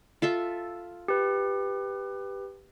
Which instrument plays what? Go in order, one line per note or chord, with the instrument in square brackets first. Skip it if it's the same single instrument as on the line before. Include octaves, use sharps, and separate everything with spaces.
[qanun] F4 A4 E5
[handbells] G4 B4